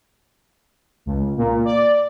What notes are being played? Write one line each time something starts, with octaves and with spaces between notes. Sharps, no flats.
C#2
A#2
D5